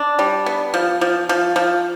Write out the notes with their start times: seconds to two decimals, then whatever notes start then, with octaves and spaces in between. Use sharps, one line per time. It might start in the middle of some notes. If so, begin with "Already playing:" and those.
Already playing: D4
0.19 G3
0.46 B3
0.74 F3
1.01 F3
1.29 F3
1.56 F3